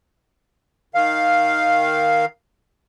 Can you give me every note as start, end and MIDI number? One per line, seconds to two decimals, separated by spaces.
0.95 2.25 51
0.95 2.25 77